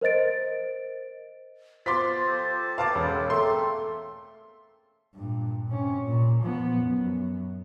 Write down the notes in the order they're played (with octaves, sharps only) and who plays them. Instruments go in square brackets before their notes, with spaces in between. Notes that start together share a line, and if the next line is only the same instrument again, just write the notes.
[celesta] A#4 C5 D#5 A6 D7
[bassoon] F3 [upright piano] C6 D6 B6 [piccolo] A6
[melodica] G4 A4 C5
[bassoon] B3 [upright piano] F5 A5 D6
[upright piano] E1 [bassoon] C#3
[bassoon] A3 [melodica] A#3 C4 A4 [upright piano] C6
[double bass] G2 A#2
C3 C#4
A#2
F3 B3
F#2